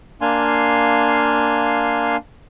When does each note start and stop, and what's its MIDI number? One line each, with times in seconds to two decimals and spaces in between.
0.21 2.16 58
0.21 2.16 62
0.21 2.16 77
0.21 2.16 80
0.21 2.16 84